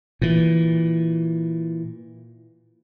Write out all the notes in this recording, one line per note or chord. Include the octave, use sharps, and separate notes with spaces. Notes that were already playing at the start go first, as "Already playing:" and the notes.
A#2 E3